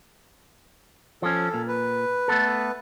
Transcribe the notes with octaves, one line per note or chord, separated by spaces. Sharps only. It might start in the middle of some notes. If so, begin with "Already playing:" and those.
F3 C#4 A4
A#2
B4
A3 B3 A4